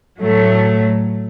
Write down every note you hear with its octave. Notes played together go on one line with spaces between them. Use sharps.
A2 F#3 A3